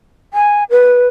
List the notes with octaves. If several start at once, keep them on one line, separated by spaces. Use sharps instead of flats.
G#5
B4